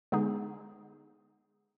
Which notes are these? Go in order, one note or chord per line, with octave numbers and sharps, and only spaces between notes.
D3 G#3 B3 D#4 G#4